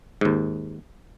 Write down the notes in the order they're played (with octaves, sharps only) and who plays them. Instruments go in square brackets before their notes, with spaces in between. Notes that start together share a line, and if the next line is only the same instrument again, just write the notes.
[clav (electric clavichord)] D#2 G#2